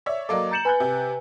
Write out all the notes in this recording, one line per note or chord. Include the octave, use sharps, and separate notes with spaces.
C#5 D5 E5
F#3 A#3 A4 D5 D#5 D6
A#5 G6 A6 C#7 E7 F#7
B4 G#5 B5 F#6 G6
C3